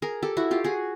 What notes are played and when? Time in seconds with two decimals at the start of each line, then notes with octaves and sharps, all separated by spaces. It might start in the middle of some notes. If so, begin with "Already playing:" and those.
0.02 G#4 A#4
0.23 G4 A4
0.37 E4 F#4
0.51 F4 G4
0.64 F#4 G#4